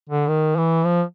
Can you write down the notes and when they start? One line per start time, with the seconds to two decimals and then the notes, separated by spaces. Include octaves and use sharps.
0.09 D3
0.28 D#3
0.57 E3
0.85 F3